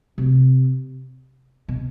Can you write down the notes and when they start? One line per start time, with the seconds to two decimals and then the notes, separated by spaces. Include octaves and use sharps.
0.18 C3
1.68 B2